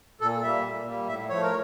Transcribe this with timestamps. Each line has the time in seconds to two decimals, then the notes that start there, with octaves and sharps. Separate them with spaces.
0.21 A#2 A4
0.43 G3 A#3 E5
0.65 A#2
0.86 G3 A#3
1.08 A2 E5
1.29 F3 A3 C#5
1.43 A#4